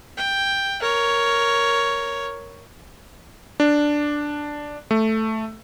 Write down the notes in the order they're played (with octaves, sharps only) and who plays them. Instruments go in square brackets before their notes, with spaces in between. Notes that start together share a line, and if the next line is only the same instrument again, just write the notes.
[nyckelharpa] G5
A#4 C#5
[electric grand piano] D4
A3